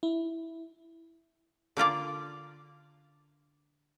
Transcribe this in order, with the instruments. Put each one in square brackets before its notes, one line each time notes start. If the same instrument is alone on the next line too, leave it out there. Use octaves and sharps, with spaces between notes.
[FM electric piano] E4
[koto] D3 A#3 F4 D5